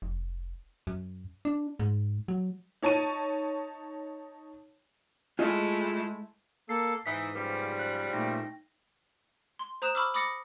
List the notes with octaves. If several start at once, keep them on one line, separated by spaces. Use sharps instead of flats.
F1
F#2
D4
G#2
F#3
D#4 C#5 A5 C#6 D#7
G#3 A3 E4 F4 G#4 D#5
A#3 A4 C7
G#2 E3 D#4 B6
C#3 F3 G3 B4
F#6
A#2 A3 D#4 G5 A#6
C6
C5 A#5 D#6 F#6 E7
B5 C#6 D6 E6 F6
B5 D6 D#6 A6 A#6 C#7